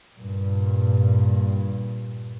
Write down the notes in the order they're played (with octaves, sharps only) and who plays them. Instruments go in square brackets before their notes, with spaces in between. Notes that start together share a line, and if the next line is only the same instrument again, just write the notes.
[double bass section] G2 A#2